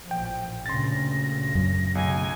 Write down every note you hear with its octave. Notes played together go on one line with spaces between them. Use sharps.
A1 A#2 F3 G5
D2 A#2 C#3 C6 A6 A#6
F#2
B1 C#3 A3 G#5